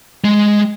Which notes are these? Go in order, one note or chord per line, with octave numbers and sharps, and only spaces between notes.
G#3